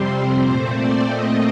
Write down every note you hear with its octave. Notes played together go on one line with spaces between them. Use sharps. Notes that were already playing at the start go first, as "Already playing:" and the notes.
Already playing: F2 C3 G3 C4 C5
A#2 A3 C4
D5
A#2 A3 C4 D#5